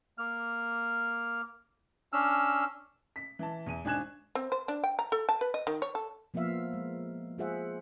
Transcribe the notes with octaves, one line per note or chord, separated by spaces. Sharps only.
A#3 F6
C#4 D4 E6 F6
B6
E3 A5
E2 D#7
G#1 D4 G#5 F#6 G#6 E7
C4
C5
D4
G5
A#5
A4
A5
B4
D#5
D#3
C#5
A4
F3 A#3 B3 F4 E5 F5
G#3
G#3 F4 G#4 C5 E5 F#5